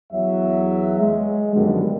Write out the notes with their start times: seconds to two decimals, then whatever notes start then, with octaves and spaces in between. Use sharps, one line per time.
0.13 E2 F#3 E5
1.00 G#3
1.54 F#2 B2 D3 D#3 F3 G3